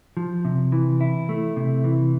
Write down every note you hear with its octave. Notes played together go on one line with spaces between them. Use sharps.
F3
C3
E3
E4
A3
C3
E3